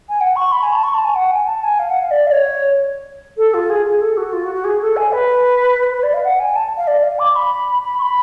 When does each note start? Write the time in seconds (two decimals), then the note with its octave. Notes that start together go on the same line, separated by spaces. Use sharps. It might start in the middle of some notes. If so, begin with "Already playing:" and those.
0.09 G#5
0.20 F#5
0.36 C#6
0.52 B5
0.62 G#5
0.73 A5
0.83 C#6
0.94 A5
1.04 G#5
1.15 F#5
1.31 G#5
1.47 A5
1.63 G#5
1.79 F5
1.90 F#5
2.00 F5
2.11 D5
2.27 F5
2.31 C#5
3.37 A4
3.54 F4
3.69 G#4
3.85 G#4
4.01 A4
4.17 F#4
4.33 F4
4.44 F#4
4.54 F#4
4.64 G#4
4.81 A4
4.96 G#5
5.12 B4
5.92 B4
6.03 D5
6.13 F5
6.24 F#5
6.39 G#5
6.55 A5
6.77 F5
6.87 D5
7.03 F5
7.19 D6
7.35 B5
7.83 B5
7.98 C#6
8.02 B5